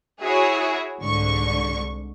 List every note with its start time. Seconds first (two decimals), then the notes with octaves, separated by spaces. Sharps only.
0.21 E4 F#4 G#4 C#5
1.03 C2 G#2 D3 C#6